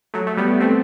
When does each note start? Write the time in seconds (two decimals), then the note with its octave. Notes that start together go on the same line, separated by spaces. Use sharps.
0.14 F#3 A3
0.27 A3
0.37 G3 B3
0.60 A3 C4